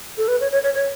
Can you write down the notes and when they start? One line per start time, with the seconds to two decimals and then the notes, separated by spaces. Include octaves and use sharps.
0.17 A4
0.28 B4
0.41 C#5
0.52 C#5
0.63 C#5
0.74 C#5